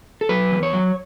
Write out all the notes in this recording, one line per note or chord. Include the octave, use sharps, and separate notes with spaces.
A4
F#3 B4
E2
C#5
F#3